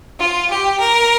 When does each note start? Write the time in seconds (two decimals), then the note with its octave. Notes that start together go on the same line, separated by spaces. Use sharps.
0.18 F4
0.49 G4
0.79 A#4